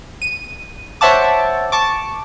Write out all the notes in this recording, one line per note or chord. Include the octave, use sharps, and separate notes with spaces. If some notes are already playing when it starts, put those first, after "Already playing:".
D#7
C5 C#5 E5 F#5 A5 D6
A5 C#6 D6